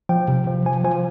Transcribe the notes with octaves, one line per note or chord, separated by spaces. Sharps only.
F3 G5
C3
F3
F3 G#5
F3 G#5